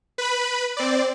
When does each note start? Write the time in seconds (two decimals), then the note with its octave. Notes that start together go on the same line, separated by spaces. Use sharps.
0.18 B4 B5
0.77 C4 D5